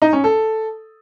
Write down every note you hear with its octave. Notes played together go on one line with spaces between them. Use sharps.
D#4
C#4
A4